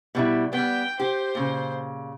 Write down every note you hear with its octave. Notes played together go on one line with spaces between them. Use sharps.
B2 G3 E4
G3 B3 G5
G4 C5
A#2 C#3